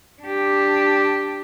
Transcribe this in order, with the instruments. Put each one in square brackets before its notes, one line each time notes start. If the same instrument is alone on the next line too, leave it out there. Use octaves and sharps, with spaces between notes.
[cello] D4 G4